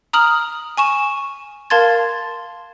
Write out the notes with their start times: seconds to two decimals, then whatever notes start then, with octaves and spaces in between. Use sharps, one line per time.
0.13 A#5 D#6 F6 F#7
0.77 G#5 C#6 E7
1.70 A#4 F5 A5 C6 G#6 A6